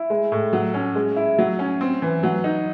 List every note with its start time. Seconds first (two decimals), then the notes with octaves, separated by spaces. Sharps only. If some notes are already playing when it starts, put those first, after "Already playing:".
Already playing: E4
0.10 G#3
0.32 A2
0.53 F#3
0.74 C#4
0.95 G#3
1.17 E4
1.38 F#3
1.59 C#4
1.81 C4
2.02 E3
2.23 F#3
2.44 D#4